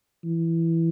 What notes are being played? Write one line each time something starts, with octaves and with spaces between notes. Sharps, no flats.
E3